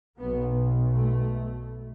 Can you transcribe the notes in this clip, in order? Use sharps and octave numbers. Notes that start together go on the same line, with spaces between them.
B1 B2 B3
A3